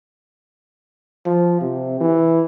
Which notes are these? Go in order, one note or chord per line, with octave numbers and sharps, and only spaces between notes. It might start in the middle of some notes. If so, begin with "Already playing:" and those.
F3
C3
E3